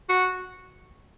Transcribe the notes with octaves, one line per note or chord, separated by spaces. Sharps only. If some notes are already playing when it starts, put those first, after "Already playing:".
F#4